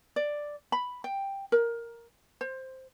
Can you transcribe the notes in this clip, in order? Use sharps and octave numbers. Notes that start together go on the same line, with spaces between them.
D5
B5
G5
A#4
C5